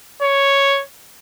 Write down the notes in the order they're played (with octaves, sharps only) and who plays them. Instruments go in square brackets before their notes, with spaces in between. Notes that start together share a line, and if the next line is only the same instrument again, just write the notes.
[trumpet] C#5